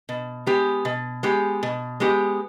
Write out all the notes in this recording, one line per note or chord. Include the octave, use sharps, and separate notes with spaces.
B2
G#3 B3 G4
B2
G#3 B3 G4
B2
G#3 B3 G4